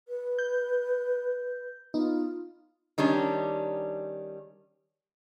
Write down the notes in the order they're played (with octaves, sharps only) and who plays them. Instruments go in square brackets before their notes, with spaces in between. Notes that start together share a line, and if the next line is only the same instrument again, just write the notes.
[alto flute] B4
[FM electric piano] G6
[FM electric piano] B3 D#4 [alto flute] F4
[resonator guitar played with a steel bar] D#3 G3 C#4 D4